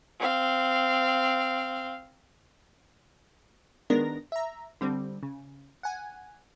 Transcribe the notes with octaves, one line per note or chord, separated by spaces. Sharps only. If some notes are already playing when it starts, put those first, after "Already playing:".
C4 F5
D#3 G#3 B3 D4 A#4 A#6
E5 A#5
D3 G3 C4
C#3
F#5 G#5